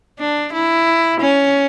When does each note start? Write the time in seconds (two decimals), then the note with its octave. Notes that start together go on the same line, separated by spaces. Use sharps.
0.19 D4
0.53 E4
1.20 C#4